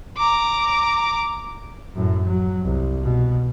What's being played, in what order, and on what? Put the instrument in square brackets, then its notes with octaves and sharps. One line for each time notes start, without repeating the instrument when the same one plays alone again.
[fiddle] A#5 D6
[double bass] F#2 A2
F#3
C2
B2